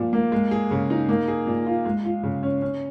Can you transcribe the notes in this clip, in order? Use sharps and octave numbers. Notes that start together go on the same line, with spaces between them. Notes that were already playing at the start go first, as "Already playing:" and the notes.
Already playing: A#2 F3 F4
A#3
G#3
G#4
C#3
D#4
A#3
G#4
A#2
F4
G#3
F4
C#3
C#4
C#4